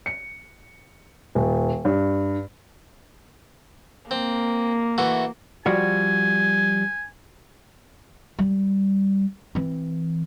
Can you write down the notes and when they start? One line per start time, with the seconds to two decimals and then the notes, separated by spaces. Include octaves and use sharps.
0.06 C#7
1.35 D#1
1.85 G2
4.11 A#3 C4
4.98 E3 A3 F#4
5.66 F3 G3 F#4 G#5
8.39 G3
9.55 E3 C4